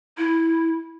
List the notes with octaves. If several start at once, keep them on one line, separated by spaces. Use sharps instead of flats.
E4